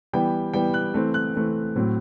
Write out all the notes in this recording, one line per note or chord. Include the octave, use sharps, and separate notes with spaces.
E3 G3 B3 G5
E3 G3 B3 G5
F#6
E3 A3 C4
F#6
E3 A3 C4
A2 F#3 C4